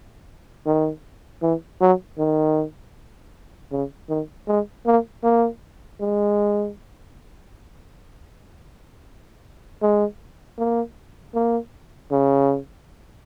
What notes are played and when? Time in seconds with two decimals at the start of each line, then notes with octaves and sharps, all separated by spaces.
0.66 D#3
1.42 E3
1.81 F#3
2.18 D#3
3.72 C#3
4.10 D#3
4.47 G#3
4.86 A#3
5.24 A#3
6.00 G#3
9.82 G#3
10.58 A#3
11.35 A#3
12.11 C#3